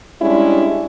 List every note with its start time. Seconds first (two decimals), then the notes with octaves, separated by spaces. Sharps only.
0.21 G3 G#3 C#4 D4 E4